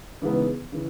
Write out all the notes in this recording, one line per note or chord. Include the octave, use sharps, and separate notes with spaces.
C#3 E3 G#3 B3 D#4
C#3 E3